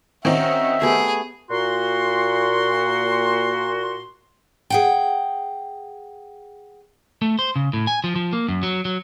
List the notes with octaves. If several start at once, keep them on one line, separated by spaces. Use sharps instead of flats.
D#3 C4 C#4 D#4 F#4 E5
A3 B3 G4 G#4
A#2 F#4 C6
G#4 F#5 G5
A3
C5
C#3
A2
G#5
F3
F3
A#3
F#2
F#3
F#3